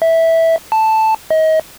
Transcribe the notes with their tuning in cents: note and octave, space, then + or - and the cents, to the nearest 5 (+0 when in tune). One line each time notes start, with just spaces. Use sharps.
E5 -10
A5 +0
D#5 +30